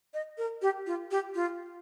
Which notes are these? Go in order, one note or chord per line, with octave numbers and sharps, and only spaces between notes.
D#5
A#4
G4
F4
G4
F4